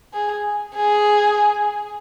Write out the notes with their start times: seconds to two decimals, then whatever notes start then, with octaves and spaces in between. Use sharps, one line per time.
0.13 G#4
0.75 G#4